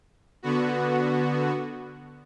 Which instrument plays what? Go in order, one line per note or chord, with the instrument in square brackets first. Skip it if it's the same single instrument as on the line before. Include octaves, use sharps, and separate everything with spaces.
[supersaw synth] D3 B3 F#4